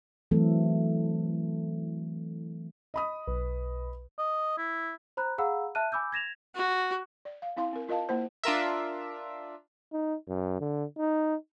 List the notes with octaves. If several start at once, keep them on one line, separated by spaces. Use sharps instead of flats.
E3 F#3 A3 C4 A4
D#5 B5 D#6
B1 B4
D#5
E4
C5 A#5 B5 F#6
G#4 F5 F#5 A#5 B5 E6
E5 A5 F6 F#6 D#7
G#5 B5 D6 E6 G6
G#6 A#6 E7 F7
F#4
D5
F5
C4 E4 F5 C6
C4 A#4
F4 A#4 D#5 F5 A5
A#3 E4 C5
D4 F4 A#4 E5
D#4
F#2
D3
D#4